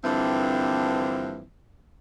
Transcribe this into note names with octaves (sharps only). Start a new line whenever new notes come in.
G2 D3 E3 F3 A#3 C4